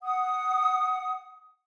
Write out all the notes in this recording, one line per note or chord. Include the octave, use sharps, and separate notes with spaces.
F#5 D#6